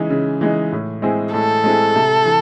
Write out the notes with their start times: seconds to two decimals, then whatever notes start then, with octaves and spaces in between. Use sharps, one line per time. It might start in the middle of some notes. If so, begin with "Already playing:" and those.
Already playing: C#3 E3 G#3 D#4
0.10 C#3
0.41 E3 G#3 D#4
0.72 A2
1.02 G#3 C4 E4 G#4
1.33 A2 A4
1.64 G#3 C4 E4 G#4
1.96 C3
2.25 E3